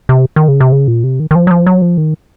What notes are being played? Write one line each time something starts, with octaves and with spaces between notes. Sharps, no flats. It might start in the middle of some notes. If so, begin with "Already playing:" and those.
C3
D#3
C#3
C3
C#3
A#2
C3
D#3
D#3
F3
F#3
F3
F#3
F3
D#3